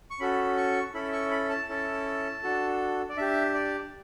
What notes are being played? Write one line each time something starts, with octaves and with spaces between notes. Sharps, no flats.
C#6
C#4 F#4 A4 B5
C#6
C#4 E4 A4 B5
C#6
B5
A5
C#4 E4 A4
D4 F#4 A4
D5
D4 G4 E5
D5